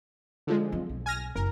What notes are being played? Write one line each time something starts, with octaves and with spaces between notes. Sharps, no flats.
D3 F3 G#3
F#3 C4
B1
G#5 F6 A#6
F#1 A#4